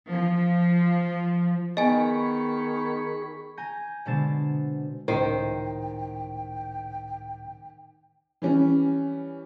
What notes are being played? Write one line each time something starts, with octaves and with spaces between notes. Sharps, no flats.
F3
D#3 B3 G#4 D#5 G#5 B5 C#6
G#5 A#5 G6 A#6
B2 D3 G#3 C5 A6 E7
C#2 A2 D#3 C5 G5
E3 G3 C#4